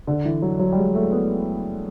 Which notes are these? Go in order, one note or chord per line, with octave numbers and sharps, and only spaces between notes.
D3
E3
F#3
F#3
G3
G#3
A3
B3